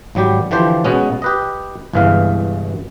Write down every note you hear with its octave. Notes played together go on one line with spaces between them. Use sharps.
G#1 F#3 G3 G4
D3 E3 F3 G4 C5
B2 G#3 B3 C#4
G4 B4 D#5
G1 C2 G2 E3 G#3 F5